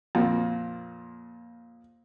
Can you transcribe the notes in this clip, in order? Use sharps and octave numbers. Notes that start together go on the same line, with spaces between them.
F2 A#2